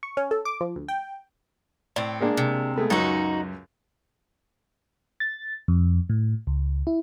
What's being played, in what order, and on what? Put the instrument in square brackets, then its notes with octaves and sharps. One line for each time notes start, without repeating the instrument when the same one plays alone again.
[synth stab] C#6
C#4
A4
D6
F3
D2
G5
[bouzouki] A2 C4 [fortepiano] D5
[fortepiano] G#3 A#3 D4
[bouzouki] C3
[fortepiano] G#3 A3 B3
[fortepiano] C#2 F#2 [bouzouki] D#4 F#4
[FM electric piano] A6
F2
A2
C#2
E4